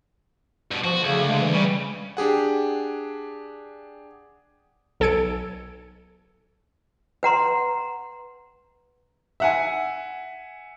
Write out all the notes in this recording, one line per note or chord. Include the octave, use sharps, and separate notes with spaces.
G2 B2
F3 F#4
D2 C#3
G#3
E3
C#3 G3
D4 G4 G#4 F#5
B1 A4 G#5 G#6 C#7 D7
B4 F#5 A#5 C6
E5 F#5 G#5